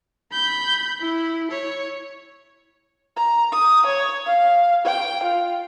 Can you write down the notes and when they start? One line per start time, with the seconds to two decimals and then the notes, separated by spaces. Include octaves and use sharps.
0.33 B5 G6
1.01 E4
1.51 C#5
3.16 A#5
3.52 D#6
3.86 C#5
4.25 F5
4.85 G5
5.23 F4